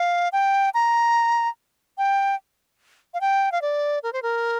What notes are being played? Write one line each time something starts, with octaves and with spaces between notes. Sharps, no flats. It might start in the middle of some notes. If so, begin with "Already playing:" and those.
Already playing: F5
G5
A#5
G5
F5
G5
F5
D5
A#4
C5
A#4